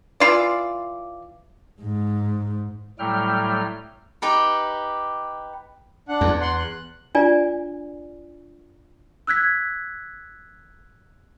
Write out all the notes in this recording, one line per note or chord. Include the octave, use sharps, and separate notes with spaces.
E3 F4 D5
G#2
A2 F#3 G3 A3 G5 F6
D#4 G4 B4
D4 F#5
E2
F#5 C6
F#6
D4 F4 D5 G#5
E6 F#6 G#6 B6